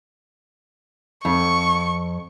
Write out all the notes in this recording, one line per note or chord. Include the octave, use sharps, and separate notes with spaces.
F2 C#6